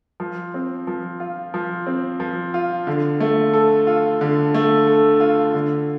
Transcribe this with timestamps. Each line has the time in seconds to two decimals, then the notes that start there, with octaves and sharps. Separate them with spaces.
0.20 F3
0.54 C4
0.87 F3
1.20 F4
1.54 F3
1.87 C4
2.20 F3
2.54 F4
2.87 D3
3.20 A3
3.54 A4
3.87 F4
4.21 D3
4.54 A3
4.87 A4
5.20 F4
5.54 D3